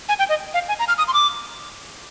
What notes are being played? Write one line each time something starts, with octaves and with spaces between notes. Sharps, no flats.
G#5
G5
D#5
F5
G#5
A#5
F6
D#6
C6
D6